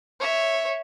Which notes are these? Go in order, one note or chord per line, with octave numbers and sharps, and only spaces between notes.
C#5 E5